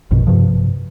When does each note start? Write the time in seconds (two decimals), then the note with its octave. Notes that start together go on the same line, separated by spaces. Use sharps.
0.11 A#1 F#2 B2
0.27 G2 C3 F3